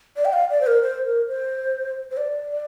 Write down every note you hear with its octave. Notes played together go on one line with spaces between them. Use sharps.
D5
G5
F5
D5
C5
A#4
C5
A#4
C5
C5
D5
D5